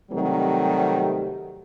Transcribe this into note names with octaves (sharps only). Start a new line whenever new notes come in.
C3 D#3 F#3 G3 A3 C4